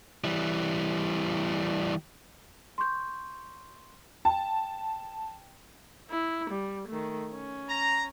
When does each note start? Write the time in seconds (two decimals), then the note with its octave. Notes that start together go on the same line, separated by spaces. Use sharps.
0.24 E3 G3
2.78 C6 C#6 G6
4.25 G5 A5
6.11 E4
6.50 G3
6.88 D#3 A3
7.33 C#4
7.69 A#5